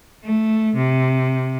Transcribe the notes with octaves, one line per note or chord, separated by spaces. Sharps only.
A3
C3